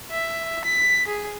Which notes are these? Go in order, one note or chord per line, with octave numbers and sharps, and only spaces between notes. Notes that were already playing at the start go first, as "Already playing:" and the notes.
E5
B6
G#4